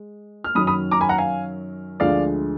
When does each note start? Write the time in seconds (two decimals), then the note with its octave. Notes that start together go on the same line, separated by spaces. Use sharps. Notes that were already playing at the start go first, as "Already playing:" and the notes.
Already playing: G#3
0.44 F6
0.55 F#2 D#3 F#3 B5 D#6
0.67 B5 D#6
0.91 A#5 D6
1.01 G#5 B5
1.09 F#5 A#5
1.18 F5 G#5
2.00 D2 D3 F3 G#3 D5 F5